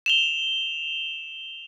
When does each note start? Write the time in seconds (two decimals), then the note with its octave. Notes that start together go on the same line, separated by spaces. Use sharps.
0.06 E7 F7 G7